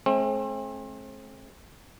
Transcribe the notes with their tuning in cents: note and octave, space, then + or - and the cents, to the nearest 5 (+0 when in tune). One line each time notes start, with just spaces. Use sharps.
A3 -45 C4 +35